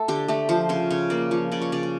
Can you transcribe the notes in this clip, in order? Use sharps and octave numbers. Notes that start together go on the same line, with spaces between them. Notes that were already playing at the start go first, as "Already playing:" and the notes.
Already playing: A3 A4
D3 G4
A3 G4
F3 C5
C#3 C5
C#3 C#5
A#3 D5
F3 C#5
C#3 D5
C#5
C#3 D5
C#5